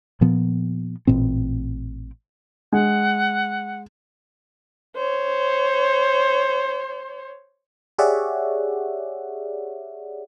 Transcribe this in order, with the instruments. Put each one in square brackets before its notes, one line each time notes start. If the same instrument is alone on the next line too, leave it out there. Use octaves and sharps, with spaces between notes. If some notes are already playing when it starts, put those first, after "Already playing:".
[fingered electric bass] A#2 F3 B3
A1 A#2 C4
[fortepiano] G#3 [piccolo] F#5
[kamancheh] C5 C#5
[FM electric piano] G4 G#4 C#5 D5 E5 F#5